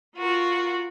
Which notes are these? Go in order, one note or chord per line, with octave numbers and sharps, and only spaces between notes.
F4 F#4 A#4